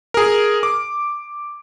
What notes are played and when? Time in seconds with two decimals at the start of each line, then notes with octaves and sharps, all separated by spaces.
0.14 G#4 A#4
0.63 D6